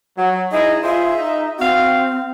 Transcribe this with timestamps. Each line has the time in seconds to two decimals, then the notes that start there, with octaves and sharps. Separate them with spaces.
0.18 F#3
0.52 D#4 E4 G#4 D#5
0.84 F4 G#4 C5 E5
1.18 D#4
1.59 C4 F#4 F5